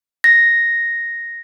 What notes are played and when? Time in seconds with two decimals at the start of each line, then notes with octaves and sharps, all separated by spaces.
0.24 A#6